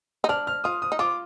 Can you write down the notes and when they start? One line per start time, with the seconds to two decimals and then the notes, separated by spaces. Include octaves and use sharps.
0.24 D#4
0.29 D4 F6
0.47 F6
0.64 F4 D#6
0.82 D#6
0.92 D#4
0.99 F4 D6